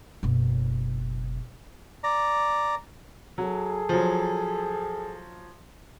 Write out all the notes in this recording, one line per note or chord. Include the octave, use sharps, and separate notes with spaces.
F#1 B2
D5 A#5
F#3 G#4 A4
F3 F#3